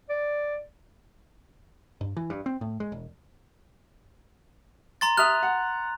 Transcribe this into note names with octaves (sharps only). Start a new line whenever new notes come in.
D5
G2
E3
G2
C4
A2
G#3
E1
A#5 C6 A6
E5 D#6 F6 F#6 F7
F#5